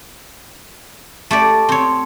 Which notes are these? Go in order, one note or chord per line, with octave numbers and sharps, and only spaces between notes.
A3 G4 D5
C4 C#5